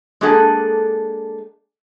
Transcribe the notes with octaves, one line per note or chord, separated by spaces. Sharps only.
G#3 A#3 D4 G#4 A4 F#5